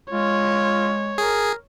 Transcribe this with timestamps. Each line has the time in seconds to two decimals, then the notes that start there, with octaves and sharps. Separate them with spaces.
0.12 G#3 F4 C#5
1.18 G#4 A#4